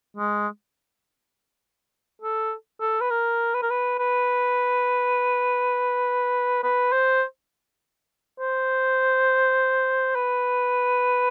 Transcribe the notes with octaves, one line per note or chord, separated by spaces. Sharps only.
G#3
A4
A4
B4
A#4
B4
A#4
B4
B4
B4
C5
C5
B4